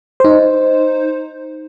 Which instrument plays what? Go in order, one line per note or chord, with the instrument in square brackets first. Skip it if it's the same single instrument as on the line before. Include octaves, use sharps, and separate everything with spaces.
[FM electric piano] D#4 C5